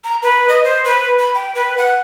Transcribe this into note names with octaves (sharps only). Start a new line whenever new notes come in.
A#5
B4
D#5
C5
B4
B5
G5
B4
F#5